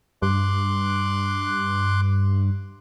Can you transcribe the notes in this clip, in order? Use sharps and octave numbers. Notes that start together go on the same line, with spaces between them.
G2 C6 D6 F#6